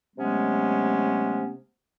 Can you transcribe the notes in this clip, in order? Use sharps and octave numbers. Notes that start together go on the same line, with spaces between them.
C3 F#3 G#3 A3 B3 C#4